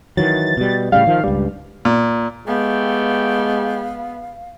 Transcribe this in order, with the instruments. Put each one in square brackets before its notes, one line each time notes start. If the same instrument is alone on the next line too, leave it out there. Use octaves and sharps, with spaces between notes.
[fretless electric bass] D#3 E3 F#3 [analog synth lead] A6
[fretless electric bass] B2 G3
[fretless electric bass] A2 C#3 G3 [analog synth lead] F5
[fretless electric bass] D#3 F3
[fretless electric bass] C#2 G2 [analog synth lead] G3
[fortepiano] A#2
[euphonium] G#3 [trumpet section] A3 G4 G5 [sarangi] B3 [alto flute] F5